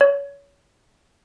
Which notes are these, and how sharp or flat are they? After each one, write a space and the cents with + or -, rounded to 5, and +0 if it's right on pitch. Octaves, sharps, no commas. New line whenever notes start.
C#5 +25